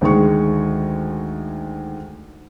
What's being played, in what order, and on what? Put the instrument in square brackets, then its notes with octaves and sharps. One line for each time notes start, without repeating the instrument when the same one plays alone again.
[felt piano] D2 D#3 G#3 C#6